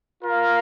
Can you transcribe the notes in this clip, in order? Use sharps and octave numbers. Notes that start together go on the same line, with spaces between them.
F4 A#4 F5